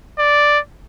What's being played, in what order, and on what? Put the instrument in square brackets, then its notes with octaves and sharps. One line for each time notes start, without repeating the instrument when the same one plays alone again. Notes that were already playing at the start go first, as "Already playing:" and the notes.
[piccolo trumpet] D5